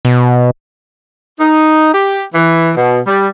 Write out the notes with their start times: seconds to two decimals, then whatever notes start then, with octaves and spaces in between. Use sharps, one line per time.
0.05 B2
1.40 D#4
1.94 G4
2.35 E3
2.76 B2
3.07 G3